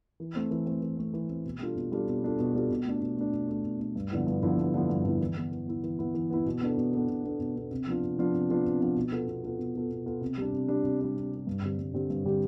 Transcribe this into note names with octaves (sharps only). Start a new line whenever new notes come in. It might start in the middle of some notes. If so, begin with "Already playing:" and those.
E3
A3 C4
E3
A3 C4
E3
A3 C4
E3
A3 C4
B2
G3 D4 F4 A4
B2
G3 D4 F4 A4
B2
G3 D4 F4 A4
B2
G3 D4 F4 A4
B2
A3 D4
B2
A3 D4
B2
A3 D4
B2
A3 D4
G2
D3 F3 B3 E4
G2
D3 F3 B3 E4
G2
D3 F3 B3 E4
G2
D3 F3 B3 E4
E3
B3 E4
E3
B3 E4
E3
B3 E4
E3
B3 E4
B2
B3 D4 A4
B2
B3 D4 A4
B2
B3 D4 A4
B2
B3 D4 A4
C3
F3 B3 D4 F4
C3
F3 B3 D4 F4
C3
F3 B3 D4 F4
C3
F3 B3 D4 F4
B2
B3 F4 A4
B2
B3 F4 A4
B2
B3 F4 A4
B2
B3 F4 A4
C3
G3 D4
C3
G3 D4
C3
G3 D4
C3
G3 D4
G2
D3 G3 C4 G4
G2
D3 G3 C4 G4
G2
D3 G3 C4 G4